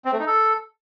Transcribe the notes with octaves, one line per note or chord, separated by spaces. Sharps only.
C4
A3
D#4
A4